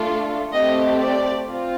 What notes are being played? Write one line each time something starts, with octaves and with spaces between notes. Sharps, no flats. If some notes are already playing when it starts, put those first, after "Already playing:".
Already playing: A3 D4 F4 A4
A3 C4 G4 D#5
D5
C4 F4